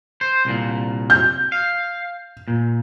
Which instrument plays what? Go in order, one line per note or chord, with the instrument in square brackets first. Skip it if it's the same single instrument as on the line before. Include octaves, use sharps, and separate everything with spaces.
[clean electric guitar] C5
C2 A#2
[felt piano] G6
[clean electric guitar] F5
A#2